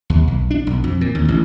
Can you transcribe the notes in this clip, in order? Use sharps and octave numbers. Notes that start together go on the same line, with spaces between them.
D#2
B1
D4
B1
F2
A#2
D#2
A1